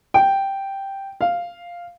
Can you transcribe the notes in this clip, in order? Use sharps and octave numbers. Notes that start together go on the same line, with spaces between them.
G5
F5